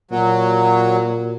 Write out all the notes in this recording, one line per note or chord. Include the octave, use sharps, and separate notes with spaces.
A#2 F#3